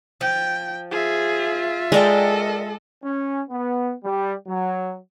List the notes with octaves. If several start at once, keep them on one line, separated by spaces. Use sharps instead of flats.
F3 G5
F4 G#4 E5
G#3 A4 A#4 D5 D#5 G5
C#4
B3
G3
F#3